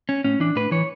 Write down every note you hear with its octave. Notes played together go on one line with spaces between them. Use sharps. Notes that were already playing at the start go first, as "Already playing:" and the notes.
C#4
A2 C#4
E3 D4
A2 B4
E3 C#5